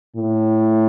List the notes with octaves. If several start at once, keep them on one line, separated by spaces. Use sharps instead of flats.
A2